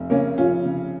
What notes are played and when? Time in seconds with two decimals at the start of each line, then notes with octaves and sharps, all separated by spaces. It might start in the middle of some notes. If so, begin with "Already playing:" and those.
Already playing: F1
0.10 C#3 A#3 C#4
0.38 F1 C#4 F4
0.65 C#3